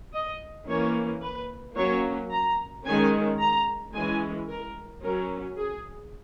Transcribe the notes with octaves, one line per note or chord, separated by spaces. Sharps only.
D#5
E3 A#3 C#4 C#5
B4
F#3 A#3 C#4 C#5
A#5
D#3 G#3 C#4 G#5
A#5
E3 G#3 C#4 G#5
A#4
F#3 C#4 A#4
G#4